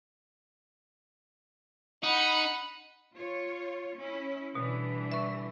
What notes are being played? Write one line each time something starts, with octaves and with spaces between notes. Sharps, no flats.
D#4 F#5 B5
F4 C#5
C#4 E4
B2 D3 E3 G3
E5 C#6